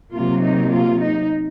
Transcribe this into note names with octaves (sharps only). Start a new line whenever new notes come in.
C3 F#3 A#3 F4
D#4
F4
D#4